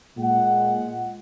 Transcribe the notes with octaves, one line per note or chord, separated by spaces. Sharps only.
A#2 G#3 F#5